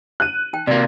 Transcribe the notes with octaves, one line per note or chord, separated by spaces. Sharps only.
F#6 D#7
D#4 G5
C3 A#3 F#4 D5